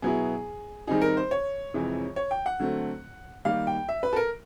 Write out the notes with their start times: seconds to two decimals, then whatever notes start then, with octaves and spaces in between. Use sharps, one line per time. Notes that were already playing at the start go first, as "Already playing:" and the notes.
0.02 B2 F#3 B3 E4 G#4
0.87 D#3 G3 C4 D#4 G#4
1.01 A#4
1.17 C5
1.31 C#5
1.74 F2 C3 E3 G#3
2.16 C#5
2.31 G5
2.46 F#5
2.60 D3 F#3 A3 C4
3.45 D#3 G3 A#3 F5
3.67 G5
3.88 E5
4.03 B4
4.13 A4
4.16 A#4